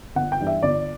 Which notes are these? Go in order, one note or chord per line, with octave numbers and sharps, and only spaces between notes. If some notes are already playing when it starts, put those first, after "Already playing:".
G1 F#5
G5
G2 E3
E5
G1 D5